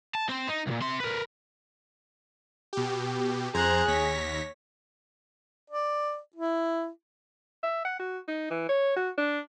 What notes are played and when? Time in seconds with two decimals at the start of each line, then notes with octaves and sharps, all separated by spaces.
0.15 A5
0.29 C4 C5
0.49 D#4
0.67 C2 A#2
0.82 C3 C6
1.00 A#4 B4
2.73 B2 G4
3.54 F2 G#4 C5 A#5 F#6 G#6
3.88 D#2 C#5 A#6 B6
5.70 D5
6.36 E4
7.63 E5
7.85 F#5
7.99 F#4
8.28 D#4
8.51 E3
8.69 C#5
8.96 F#4
9.18 D4